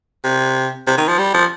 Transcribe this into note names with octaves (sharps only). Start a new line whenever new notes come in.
C3
C3
D#3
F3
G3
F3